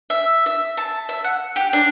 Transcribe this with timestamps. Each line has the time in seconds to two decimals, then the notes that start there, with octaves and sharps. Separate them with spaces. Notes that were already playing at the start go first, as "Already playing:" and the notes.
0.10 E5
0.46 E5
0.77 A5
1.09 E5
1.24 F#5
1.56 G4
1.73 D4